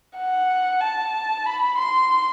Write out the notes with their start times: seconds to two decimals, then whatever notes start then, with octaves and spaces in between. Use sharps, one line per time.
0.16 F#5
0.80 A5
1.46 B5
1.78 C6